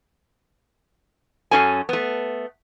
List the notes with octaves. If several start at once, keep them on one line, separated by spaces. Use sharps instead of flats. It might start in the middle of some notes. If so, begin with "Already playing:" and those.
F#2 F#3 C#4 A4 G#5
A3 B3